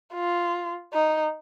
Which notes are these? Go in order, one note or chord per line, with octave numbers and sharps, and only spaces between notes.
F4
D#4